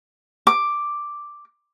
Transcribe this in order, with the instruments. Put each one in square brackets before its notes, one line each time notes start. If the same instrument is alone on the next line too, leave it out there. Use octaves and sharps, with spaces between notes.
[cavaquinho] D6